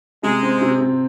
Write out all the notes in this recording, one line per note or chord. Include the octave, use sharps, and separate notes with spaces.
C3 G#3
C4
C3
C3